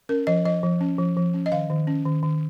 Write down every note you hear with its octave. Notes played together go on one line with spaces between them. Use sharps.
C#4 A#4
F3 D#5
F3 D#5
F3
C#4
F3
F3
C#4
D#5
D#3 F5
D#3
C#4
D#3
D#3